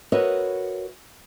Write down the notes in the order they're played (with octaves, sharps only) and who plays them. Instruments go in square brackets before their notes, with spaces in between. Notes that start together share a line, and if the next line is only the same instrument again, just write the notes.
[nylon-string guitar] F#4 A#4 B4 C#5 D#5 E5